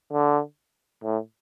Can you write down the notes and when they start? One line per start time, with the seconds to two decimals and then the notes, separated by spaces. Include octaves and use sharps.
0.13 D3
1.04 A2